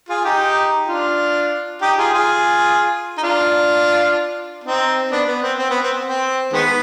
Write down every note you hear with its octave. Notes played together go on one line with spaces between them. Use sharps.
F4 G#4
D#4 G4
D4 F4
D#4 G4
F4 G#4
F4 G#4
D#4
D4 F4
C4 D#4
B3 D4
B3
C4
C4
B3
C4
C4
D#3 G#3 B3